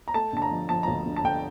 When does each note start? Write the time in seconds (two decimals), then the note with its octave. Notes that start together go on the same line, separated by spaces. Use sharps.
0.08 A#5
0.14 A3 A5
0.33 D3 A5
0.42 A#5
0.51 F3
0.69 F3 A5
0.83 A#5
0.88 D2
1.06 D3
1.16 A5
1.24 D3 G5